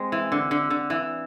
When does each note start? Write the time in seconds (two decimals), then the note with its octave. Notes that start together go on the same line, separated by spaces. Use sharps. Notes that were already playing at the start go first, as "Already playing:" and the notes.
Already playing: G#3 C4
0.12 E3
0.32 D3
0.51 D3
0.70 D3
0.90 E3